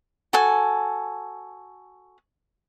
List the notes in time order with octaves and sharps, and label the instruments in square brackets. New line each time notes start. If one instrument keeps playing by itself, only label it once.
[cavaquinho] F#4 A4 G#5